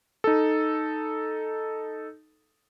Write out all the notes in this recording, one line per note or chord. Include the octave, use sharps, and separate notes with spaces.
D#4 A4